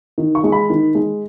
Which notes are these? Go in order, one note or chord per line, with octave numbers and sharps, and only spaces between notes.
D#3
C#6
G#3
B5
D#3
G#3